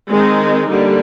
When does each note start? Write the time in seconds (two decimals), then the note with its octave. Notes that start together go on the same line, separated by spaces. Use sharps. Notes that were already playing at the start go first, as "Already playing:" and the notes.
0.11 D#3 G#3 C4 D#4
0.68 D3 G3 A#3